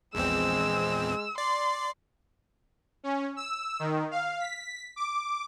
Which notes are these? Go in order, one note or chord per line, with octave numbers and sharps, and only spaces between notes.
A#1 E2 G#3 C4 E6
D5 C6
C#4
E6
D#3
F5
B6
D6